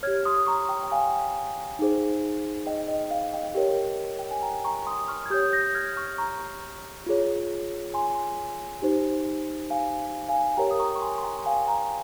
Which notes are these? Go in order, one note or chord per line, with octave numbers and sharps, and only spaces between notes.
G4 C#5 F6 G#6
C6 D#6
A#5 C#6
G5 A#5
G5
F5 G#5
D#4 G#4 C5
D#5 G5
D#5
F5
D#5 G5
G4 A#4 C#5
G5
G#5
G5 A#5
A#5 C#6
C6 D#6
C#6 F6
G#6
G4 C#5 D#6 G6
G6 A#6
F6 G#6
C#6 F6
A#5 C#6
F4 G#4 C#5
G#5 C6
D#4 G4 C5
F5 G#5
F5 G#5
G4 A#4 C#5 G5 A#5
D#6
A#5 C#6
C#6
G#5 C6
C6
G5 A#5
F5 G#5
G5 A#5